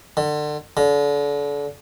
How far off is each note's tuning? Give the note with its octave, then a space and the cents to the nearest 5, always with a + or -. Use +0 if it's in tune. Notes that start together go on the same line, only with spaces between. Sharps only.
D3 +30
D3 -35